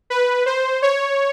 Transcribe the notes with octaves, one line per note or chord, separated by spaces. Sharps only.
B4
C5
C#5